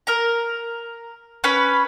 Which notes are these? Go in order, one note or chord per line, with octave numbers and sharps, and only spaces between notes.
A#4 A#5
C#4 B4 B5